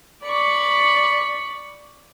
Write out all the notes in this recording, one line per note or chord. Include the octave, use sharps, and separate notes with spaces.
D5 B5 C#6